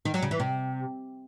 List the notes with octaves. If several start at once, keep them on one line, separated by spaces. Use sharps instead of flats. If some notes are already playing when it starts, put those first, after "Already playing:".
D#3
F#3
C#3
E3
C3